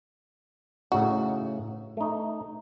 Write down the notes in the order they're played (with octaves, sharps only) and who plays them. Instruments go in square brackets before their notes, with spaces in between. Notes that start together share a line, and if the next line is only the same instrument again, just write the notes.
[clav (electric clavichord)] A2 C#3 D#4 [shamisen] F#4
[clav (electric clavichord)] A3 D#4